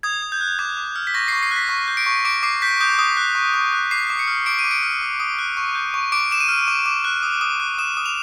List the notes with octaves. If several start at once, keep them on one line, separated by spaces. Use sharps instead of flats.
D#6 G#6
D#6
G6
F#6
D6 G#6
D6
F6
B6
C#6 A#6
C#6 C7
C7
F#6 B6
C#6
G6
D7
C#6
D6 D7
D6 C7
G6 B6
D#6 G6
D#6
F#6
C#6
C#6
F#6
D6 C7
D6
C#7
F6
D6 D7
D#7
D6
D7
F6
D#6
D#6
F#6
C#6
G6
C#6
D6 D7
D6 E7
D#7
F6
D6
D6
F#6
D#6
D#6
F#6
D#6 E7
D#6
F7